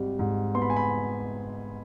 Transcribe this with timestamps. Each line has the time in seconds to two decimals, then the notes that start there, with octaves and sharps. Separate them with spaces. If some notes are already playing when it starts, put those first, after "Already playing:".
Already playing: G#1 G3
0.19 G#2
0.55 B3 C6
0.62 B5
0.70 G#5
0.77 B5